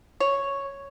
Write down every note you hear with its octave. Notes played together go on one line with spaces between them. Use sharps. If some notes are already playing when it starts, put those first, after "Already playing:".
C#5